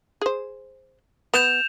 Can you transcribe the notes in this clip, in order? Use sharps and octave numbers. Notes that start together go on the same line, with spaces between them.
G#4 C5
B3 G6 E7 F7